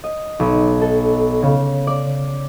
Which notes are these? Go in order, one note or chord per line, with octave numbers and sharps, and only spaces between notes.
D#5
B1
A4
C#3
D5